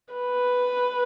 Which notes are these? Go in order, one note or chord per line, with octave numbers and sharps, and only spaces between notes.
B4